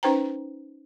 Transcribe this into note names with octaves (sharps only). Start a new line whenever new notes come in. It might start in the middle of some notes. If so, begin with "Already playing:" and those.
C#4 D#4 B4 C5 G5 A#5